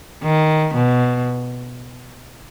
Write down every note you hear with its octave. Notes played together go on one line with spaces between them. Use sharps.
D#3
B2